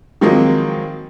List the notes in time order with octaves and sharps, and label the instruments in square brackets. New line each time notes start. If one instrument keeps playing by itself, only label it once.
[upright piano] D#3 F3 F#3 G#3 A#3 C4